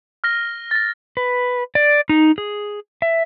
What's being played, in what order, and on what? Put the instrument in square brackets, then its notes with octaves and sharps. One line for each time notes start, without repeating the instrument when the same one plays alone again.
[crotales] F6 A#6 G7
A6 A#6
[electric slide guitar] B4
D5
D#4
G#4
E5